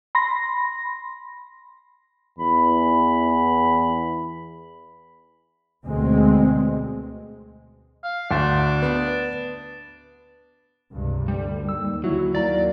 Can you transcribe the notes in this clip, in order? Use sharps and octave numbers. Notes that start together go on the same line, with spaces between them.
B5 C6 A#6
E2 B5
D2 B2 G#3 C4
F5
D2 D4
B3
C#2 G2 C3
D2 D3 G3
D#2 E6
D2 F#3 E4 F#4
D#2 F#3 A#3 D5 A#5 A6